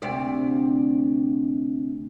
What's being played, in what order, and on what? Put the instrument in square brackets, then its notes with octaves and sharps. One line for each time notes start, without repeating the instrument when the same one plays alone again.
[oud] D2 C3 D5